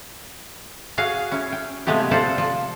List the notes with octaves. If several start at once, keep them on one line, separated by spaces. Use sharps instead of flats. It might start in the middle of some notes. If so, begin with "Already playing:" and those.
F#4 G#4 F5
C#4 E4
G5
C3 F3 G#3 A3 B3 G4
F4 A4 C5 D5
F3